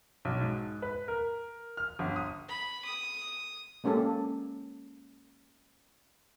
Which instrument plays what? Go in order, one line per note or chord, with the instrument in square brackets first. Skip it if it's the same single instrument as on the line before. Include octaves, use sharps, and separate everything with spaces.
[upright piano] B1
G#2
B4
A#4
F6
G1
D#6
[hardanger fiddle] B5
D#6
[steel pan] G#3 A#3 C#4 G4 A4